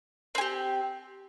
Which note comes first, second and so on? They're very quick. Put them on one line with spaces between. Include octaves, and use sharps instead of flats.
C4 G#4 G4